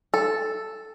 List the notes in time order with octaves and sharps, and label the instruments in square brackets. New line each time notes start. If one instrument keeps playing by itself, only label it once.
[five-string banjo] A4